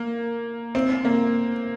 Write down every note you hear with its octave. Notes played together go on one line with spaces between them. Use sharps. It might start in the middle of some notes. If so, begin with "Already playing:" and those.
Already playing: A#3
C4
A#3